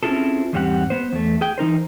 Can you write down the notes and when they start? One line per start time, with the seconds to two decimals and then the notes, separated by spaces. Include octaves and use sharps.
0.03 C4 C#4 E4 F4 G#4 A4
0.53 E2 G#2 G3 C4 G4 F#5
0.90 B3 C5
1.13 E2 A3
1.41 G#4 G5
1.58 E3 D#4 A#4 C5